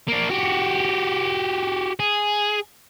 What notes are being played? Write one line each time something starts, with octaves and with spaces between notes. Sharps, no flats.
A#3 D4
F#4 G4
G#4